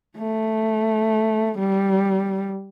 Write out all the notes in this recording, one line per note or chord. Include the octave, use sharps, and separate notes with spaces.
A3
G3